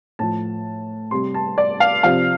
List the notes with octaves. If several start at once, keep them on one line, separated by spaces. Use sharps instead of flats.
A2 F3 A5
C3 G3 C6
A5
D5
F5
C3 F3 F5